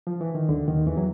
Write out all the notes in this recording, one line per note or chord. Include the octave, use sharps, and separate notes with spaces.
F3
E3
D#3
D2 D3
D#2 D#3
E2 E3
F#3